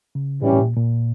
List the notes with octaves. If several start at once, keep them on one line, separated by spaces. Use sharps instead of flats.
C#3
A2 E3 G3 C#4 G4
A2
A#2
A#2